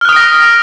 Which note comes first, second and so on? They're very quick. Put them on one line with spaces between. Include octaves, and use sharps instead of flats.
F6 F#6 D#6 D7 A#6